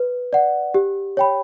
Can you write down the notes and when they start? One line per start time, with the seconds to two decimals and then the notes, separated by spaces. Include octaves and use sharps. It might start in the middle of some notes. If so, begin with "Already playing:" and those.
Already playing: B4
0.33 D5 F#5
0.74 G4
1.17 C#5 G5 B5